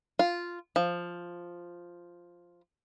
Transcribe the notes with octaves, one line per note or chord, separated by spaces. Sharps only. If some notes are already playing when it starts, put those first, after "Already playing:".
F4
F3